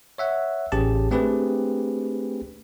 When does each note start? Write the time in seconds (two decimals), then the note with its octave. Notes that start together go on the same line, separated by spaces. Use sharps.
0.18 C#5 E5 F#5
0.72 A1 C#4 G4 G#4 A5
1.11 A3 C4 D4 G4 G#4 B4